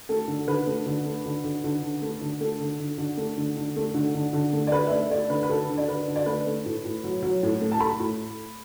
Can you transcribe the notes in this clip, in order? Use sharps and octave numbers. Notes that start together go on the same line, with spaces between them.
A3 A4
D3
D3 B4
A3
D3
A3
D3
D3
D3
D3
A3
D3
A3 A4
D3
D3
D3
A3
D3
D3
A3
D3
D3
D3
A3
D5
A3 B4
E5
A3 D5
A3 D5
D3 B4
B4
D3 A4
D3
D5
D3 B4
D3
D5
A3 B4
A3
A2
A2
F#3
F#3
A2
A3
A5
A3 B5
A2